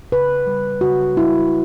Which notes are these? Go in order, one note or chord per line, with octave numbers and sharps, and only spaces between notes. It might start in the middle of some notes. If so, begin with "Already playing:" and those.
C#3 B4
G3
C#3 F#4
G3 E4